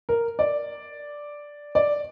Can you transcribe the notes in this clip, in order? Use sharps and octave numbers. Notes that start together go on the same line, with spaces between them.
A#4
D5
D5